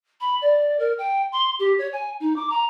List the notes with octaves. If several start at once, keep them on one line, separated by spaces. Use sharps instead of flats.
B5
D5
A#4
G5
C6
G4
C#5
G#5
D#4
D6
A#5